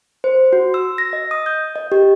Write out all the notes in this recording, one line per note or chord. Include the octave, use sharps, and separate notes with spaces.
C5
F#4
E6
A#6
D#5
D#6
G6
D#5
G4